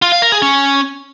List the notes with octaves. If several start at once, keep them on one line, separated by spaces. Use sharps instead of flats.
F4
F5
A#4
G#4
C#4